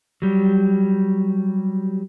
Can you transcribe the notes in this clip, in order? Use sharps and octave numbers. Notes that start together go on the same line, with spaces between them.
F#3 G3